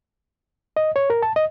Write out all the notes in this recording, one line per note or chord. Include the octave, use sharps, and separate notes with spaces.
D#5
C#5
A#4
A5
D#5